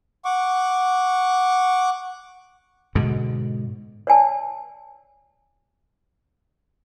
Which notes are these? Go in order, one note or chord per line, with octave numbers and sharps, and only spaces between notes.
F#5 C#6 D6
G#2 B2 D3
C#5 D5 G#5 A5